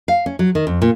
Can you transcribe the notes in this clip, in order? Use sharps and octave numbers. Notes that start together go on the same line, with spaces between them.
F5
C#4
F#3
D#3
F2
A#2